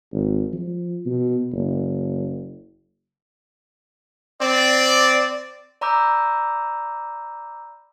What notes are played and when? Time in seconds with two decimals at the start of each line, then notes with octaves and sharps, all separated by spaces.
0.12 G#1
0.53 F3
1.06 B2
1.53 F#1
4.42 C4 D5
5.81 D5 A#5 B5 D6 E6 G6